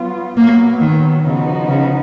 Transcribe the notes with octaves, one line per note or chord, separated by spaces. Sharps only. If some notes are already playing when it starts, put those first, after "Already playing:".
Already playing: F#3 B3 F4
A#2 F#3 A#3 B3
D#3
C#3 F3 B3 D#4 F#4
C#3